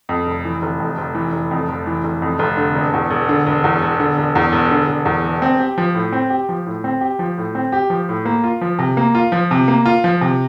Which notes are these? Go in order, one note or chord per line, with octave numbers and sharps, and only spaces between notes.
F2
F1
E3
F1
F2
F1
E3
F1
F2
F1
E3
F1
F2
F1
D3
E1
E2
E1
D3
E1
E2
E1
D3
E1
E2
E1
D3
E1
E2
E1
C4
G4
F3
A2
C4
G4
F3
A2
C4
G4
F3
A2
C4
G4
F3
A2
A#3
F4
F3
C3
A#3
F4
F3
C3
A#3
F4
F3
C3